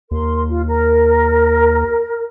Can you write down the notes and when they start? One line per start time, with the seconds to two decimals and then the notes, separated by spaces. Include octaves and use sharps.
0.11 D#2 A#4 C6
0.49 F4
0.68 A#4